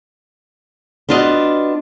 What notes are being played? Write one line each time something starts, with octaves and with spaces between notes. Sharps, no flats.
B3 D4 F4 F#4 D#5